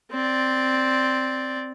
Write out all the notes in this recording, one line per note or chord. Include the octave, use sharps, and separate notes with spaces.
C4 D5